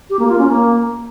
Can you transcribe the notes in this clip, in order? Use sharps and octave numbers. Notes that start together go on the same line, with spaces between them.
G4
A#3
F4
C#4
A#3